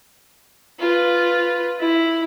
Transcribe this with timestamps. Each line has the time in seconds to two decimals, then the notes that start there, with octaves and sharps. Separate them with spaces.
0.79 F4 B4
1.79 E4